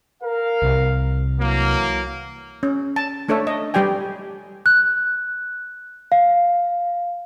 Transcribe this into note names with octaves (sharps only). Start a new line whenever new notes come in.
A#4 F5
C2
E3 F#3 A#3
C#4
A5
A3 D4 A4 C#5 E5
D#5
G3 G4 D5 G5 G#5
F#6
F5